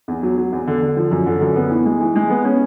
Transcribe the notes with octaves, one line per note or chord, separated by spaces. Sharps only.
E2
F#3
F#3
E2
D3
D3
F3
F#2
D3
F#2
B3
E3
G#3
E3
G#3
B3
C#4